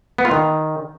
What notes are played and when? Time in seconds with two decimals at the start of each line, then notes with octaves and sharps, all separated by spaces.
0.18 B3
0.25 F4
0.31 D#3